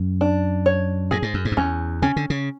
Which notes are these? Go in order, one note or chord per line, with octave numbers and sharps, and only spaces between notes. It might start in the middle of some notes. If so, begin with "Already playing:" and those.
Already playing: F#2
D4
C#5
A2 G#4
G#2
F#2
G#2
F#2
E2 C#4
C#3 C#4
D3
C#3